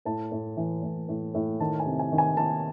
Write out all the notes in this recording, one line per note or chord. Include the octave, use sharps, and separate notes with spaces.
A2 A5
A2
E3
A2
A2
A2
D#3 A5
G#5
C3
G#5
D#3
G#5
D#3 A5